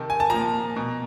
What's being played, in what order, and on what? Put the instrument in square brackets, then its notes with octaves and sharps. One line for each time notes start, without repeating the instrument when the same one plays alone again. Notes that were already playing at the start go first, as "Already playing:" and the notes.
Already playing: [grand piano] C3 D#3 A5
G#5
A5
A#2 F3 A#5
B2